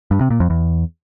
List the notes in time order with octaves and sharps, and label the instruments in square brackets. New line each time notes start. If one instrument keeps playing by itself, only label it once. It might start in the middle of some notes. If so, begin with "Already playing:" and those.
[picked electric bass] G2
C3
A#2
F2
E2